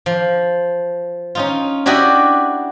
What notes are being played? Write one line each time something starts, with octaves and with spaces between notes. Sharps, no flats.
F3
C#4 D#4 F4
D4 E4 F#4 G4 D5 D#5